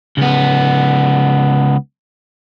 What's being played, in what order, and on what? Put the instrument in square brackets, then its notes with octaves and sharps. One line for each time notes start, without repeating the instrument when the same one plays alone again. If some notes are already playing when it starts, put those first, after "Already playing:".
[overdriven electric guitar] C#2 B3